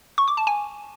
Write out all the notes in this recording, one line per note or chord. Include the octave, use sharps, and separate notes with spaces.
C#6
D6
A5
G#5